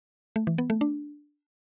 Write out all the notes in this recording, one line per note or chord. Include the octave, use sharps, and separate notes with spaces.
A3
E3
B3
A3
D4